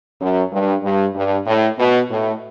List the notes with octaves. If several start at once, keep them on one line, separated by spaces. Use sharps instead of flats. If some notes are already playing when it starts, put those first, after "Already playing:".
F#2
G2
G2
G2
A2
B2
A2